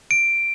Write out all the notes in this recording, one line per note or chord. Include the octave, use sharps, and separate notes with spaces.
D7